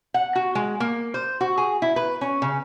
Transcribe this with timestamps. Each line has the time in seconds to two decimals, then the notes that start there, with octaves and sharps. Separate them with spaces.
0.14 F#5
0.35 F#4
0.55 G#3
0.80 A#3
1.14 C5
1.41 F#4
1.58 G#4
1.82 E4
1.96 B4
2.21 C#4
2.42 C#3